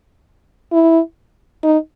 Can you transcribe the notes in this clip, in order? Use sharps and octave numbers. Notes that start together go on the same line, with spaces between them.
E4
D#4